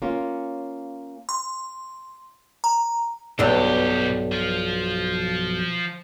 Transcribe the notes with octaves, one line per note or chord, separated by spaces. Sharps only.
A#3 C#4 F4
C6
A#5
B1 G2 B2 G4
F3 F4